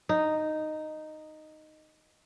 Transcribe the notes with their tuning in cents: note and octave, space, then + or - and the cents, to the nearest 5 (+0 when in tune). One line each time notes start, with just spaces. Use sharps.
D#4 -5